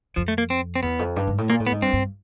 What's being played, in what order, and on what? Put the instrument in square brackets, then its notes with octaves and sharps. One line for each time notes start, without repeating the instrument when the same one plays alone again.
[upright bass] F2 [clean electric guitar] F3
[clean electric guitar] A3
A#3
C4
C4
[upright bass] E2 [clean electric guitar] B3
[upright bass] F2
G2
G#2
A2
[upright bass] A#2 [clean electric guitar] A#3
[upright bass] A2
[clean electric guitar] B3
[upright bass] G#2
[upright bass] G2 [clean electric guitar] C4
[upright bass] G2